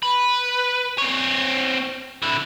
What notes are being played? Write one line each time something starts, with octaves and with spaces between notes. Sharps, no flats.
B4
C4 C#5
D3 E4